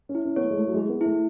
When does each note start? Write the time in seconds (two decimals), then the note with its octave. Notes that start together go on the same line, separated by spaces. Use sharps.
0.09 C#4
0.15 E4
0.25 C#4
0.36 B3 C#5
0.41 A3
0.51 G#3
0.57 A3 E4
0.67 F#3
0.74 G#3 G#4
0.89 B3
1.01 A3 E4